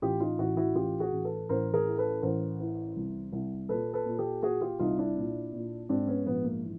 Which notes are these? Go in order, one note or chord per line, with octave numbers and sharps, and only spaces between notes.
A1 F4 G4
D#4 F4
A1 E4 F#4
E4 F#4
A1 F4 G4
F#4 G#4
A1
A4 B4
A1 A#4 C5
G#4 A#4
E3
A4 B4
A1 A#4 C5
E3
C2
C2
A#2 A4 B4
A4 B4
A#2
G4 A4
A#2 F#4 G#4
F4 G4
C2 D#4 F4
D4 E4
A#2
A#2
G#2 C4 D4
B3 C#4
A#1 B3
A#3
E3